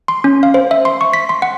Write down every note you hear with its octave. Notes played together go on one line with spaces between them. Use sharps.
C6
C#4
F5
C5
E5
C6
C#6
B6
C6
F#5